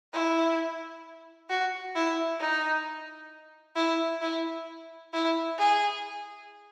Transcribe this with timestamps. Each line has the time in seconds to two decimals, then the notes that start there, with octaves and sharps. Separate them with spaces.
0.14 E4
1.49 F#4
1.95 E4
2.40 D#4
3.76 E4
4.21 E4
5.13 E4
5.58 G#4